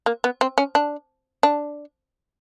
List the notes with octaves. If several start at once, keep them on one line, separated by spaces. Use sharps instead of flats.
A#3
B3
C4
C#4
D4
D4